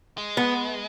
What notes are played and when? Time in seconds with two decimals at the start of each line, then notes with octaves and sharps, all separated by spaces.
0.18 G#3
0.37 B3